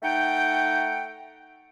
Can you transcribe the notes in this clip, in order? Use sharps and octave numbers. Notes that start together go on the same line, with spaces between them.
A3 D#4 F#5 G5